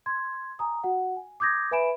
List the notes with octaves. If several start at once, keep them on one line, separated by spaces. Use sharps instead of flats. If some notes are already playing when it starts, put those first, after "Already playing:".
C6 G#6
G#5 A#5 D#6
F#4 F#5
G#5
D6 D#6 G6 G#6 A#6
B4 E5 G#5 B5 D7 E7